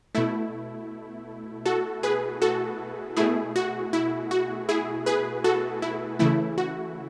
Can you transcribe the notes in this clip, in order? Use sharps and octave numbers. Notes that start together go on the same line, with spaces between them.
B2 A3 E4
F#4 A4
G#4 B4
F#4 A4
B2 A3 E4 G#4
F#4
E4
F#4
E4 G#4
G#4 B4
F#4 A4
E4
C#3 E3 A3 E4
F#4